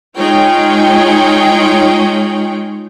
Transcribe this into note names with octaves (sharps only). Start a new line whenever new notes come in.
G#3 D#4 F4 G#4 C#5 G5